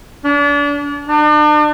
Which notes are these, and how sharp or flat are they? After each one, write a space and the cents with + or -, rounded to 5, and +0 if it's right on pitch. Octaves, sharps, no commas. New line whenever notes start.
D4 -35
D4 +40